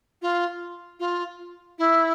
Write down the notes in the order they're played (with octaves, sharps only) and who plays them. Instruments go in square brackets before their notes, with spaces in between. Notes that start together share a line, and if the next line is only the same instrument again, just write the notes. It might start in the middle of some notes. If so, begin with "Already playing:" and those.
[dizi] F4
F4
E4